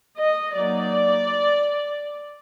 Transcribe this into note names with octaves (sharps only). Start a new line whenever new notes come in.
D#5
F#3 A#3 D#4 D5